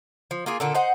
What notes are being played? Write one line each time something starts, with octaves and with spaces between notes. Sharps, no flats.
F3
A#3 F4 G#4
A#2 D3 A4
D#4 C5 F#5